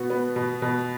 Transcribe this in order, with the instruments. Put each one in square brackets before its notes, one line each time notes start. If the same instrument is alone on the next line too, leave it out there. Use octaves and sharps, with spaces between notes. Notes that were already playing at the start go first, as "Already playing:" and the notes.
Already playing: [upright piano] B2 B3 [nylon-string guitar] F#4
[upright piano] B3
B2
B2